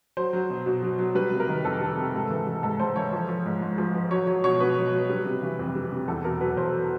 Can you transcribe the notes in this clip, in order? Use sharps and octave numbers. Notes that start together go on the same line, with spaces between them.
F#3 C5
F#3
B2
B2
F#3
F#3
G3 B4
C3
A#4
D#3
F2 A4
G3
C3
G#2
E3
G3
G#2 A4
G#2 C5
E3 C#5
F3
F3
G#2
G#2
F3
F3
F#3 C#5
F#3 C#5
B2 C#5
B2 B4
F#3
F#3
G3
C3
E3
F2
G3
C3
E2 A4
B2 A#4
F#3 B4
E2 C5